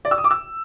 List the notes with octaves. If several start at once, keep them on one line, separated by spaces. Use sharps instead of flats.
D5
E6
D#6
D6
E6